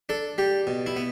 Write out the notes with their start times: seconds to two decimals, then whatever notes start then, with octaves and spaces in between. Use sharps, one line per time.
0.09 D4 A4
0.38 G3 G4
0.67 B2
0.86 E4
0.96 B3